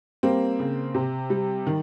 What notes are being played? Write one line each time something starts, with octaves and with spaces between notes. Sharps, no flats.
G3 A#3 C4
C#3
C3
G3
D#3